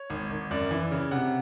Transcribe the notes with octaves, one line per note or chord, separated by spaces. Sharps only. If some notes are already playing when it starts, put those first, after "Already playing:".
Already playing: C#5
G#1
G#1
F#2 D5
E3
C#3
C3 F#5